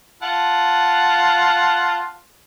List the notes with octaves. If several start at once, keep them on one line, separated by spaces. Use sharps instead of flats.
F4 F#5 A5